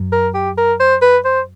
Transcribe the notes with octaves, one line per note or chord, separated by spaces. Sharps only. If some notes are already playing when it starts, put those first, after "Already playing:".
Already playing: F#2
A#4
G4
A#4
C5
B4
C5